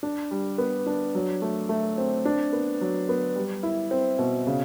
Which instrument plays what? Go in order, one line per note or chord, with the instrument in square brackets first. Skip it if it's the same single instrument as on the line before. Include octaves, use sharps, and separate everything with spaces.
[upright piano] D4
G3
B3
D4
F#3
A3
A3
C4
D4
B3
F#3
B3
G3
E4
C4
B2
C#3